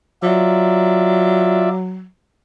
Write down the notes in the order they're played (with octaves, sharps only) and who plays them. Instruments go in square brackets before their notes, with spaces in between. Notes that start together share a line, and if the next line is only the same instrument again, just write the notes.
[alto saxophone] F#3 [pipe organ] F4 D5 E5